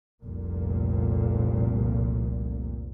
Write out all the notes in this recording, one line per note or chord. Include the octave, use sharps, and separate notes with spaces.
F1 C2 A#2